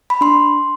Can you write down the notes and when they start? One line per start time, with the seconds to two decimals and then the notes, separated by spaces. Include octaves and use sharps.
0.10 B5
0.21 D4 C6